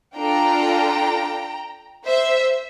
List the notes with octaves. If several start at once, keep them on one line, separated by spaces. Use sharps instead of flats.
D4 F4 A4 G5 A#5
C5 E5